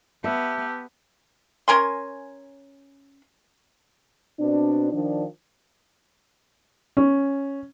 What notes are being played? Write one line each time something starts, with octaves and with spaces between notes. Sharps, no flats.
B3 G4 E5 A5 E6 F#6
C#4 A#4 G#5 C6
B2 C4 D4
D#3 F3 D4
C#4